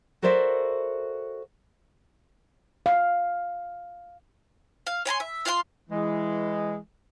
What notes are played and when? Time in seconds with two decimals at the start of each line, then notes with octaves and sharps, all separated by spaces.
0.22 F#4 A4 A#4 C5 D5 E5
2.86 F5
4.87 F5
5.06 C#5 G#5 A#5 C6
5.20 E5
5.45 F4 F5 F#5 C6
5.90 E3 G#3